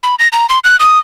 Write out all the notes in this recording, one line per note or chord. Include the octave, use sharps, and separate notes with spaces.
B5
A#6
A#5
C6
F#6
D#6